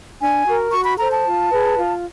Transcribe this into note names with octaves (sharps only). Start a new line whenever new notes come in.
D4 G#5
F#4 A#4
F#4 C#6
B5
A4 C5 A#5
A5
F4
G#4 B4
F4